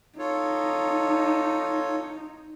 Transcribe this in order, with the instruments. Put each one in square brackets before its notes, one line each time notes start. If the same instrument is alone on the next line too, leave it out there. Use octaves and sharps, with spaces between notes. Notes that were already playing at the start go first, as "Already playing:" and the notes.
[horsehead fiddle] D#4 [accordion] F4 A4 C#5